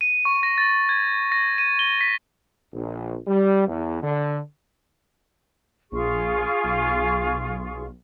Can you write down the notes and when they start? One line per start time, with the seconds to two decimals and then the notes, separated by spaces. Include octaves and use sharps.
0.01 D#7
0.25 C#6
0.43 A#6
0.58 A6
0.89 G#6
1.32 A#6
1.58 D#7
1.79 G7
2.01 B6
2.73 A#1
3.26 G3
3.67 E2
4.02 D3
5.92 A#1 F4 G#4 C#6
6.64 B1